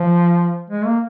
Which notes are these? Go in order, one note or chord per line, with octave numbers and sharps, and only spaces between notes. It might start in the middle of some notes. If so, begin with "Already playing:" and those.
Already playing: F3
G#3
A#3